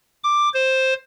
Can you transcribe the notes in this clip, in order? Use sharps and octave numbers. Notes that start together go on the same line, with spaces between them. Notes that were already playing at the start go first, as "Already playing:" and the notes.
D6
C5